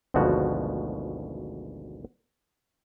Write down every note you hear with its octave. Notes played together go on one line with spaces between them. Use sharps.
G#1 D2 B2 F3 F#4